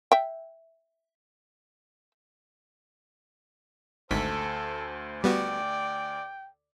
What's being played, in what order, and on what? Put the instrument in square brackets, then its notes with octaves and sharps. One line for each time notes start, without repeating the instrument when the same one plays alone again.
[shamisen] E5 G5
[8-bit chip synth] G#1 G#2 B6 [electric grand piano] D2 [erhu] A4 [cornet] C5
[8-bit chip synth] G3 B3 F#4 [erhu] D5 [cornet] G5